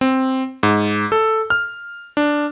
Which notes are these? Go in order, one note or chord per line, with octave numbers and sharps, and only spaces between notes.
C4
G#2
A4
F6
D4